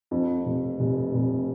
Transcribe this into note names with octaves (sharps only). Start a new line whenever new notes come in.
F2
F1
F1
F1